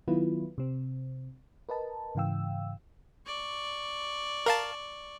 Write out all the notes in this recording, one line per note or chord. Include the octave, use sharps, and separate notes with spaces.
D#3 F#3 B3 E4 F4 B4
C3 C4
A#4 B4 D#5 A5
G#2 C#3 E3 F5 G5 E6
D5 C#6
A#4 F5 A5